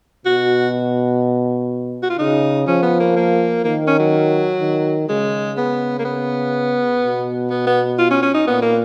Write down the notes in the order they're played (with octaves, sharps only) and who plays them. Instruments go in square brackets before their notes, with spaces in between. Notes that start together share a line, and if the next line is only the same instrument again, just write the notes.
[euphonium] B2 [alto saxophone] F#4
[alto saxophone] F#4
F4
[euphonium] C#3 [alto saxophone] D#4
[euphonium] F3 [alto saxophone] C#4
[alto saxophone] B3
A#3
A#3
[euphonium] D#3 [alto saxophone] A#3
[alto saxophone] C#4
F#3
[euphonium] D#3
[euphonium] C#3 [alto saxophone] G#3
[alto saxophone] B3
A#3
B3
[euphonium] B2
[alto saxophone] B3
B3
F4
C#4
C#4
D#4
[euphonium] A#2 [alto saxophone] B3
[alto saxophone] A#3